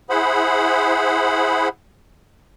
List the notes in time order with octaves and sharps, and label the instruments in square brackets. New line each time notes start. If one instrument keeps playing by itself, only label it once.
[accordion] E4 G#4 C5 F#5 B5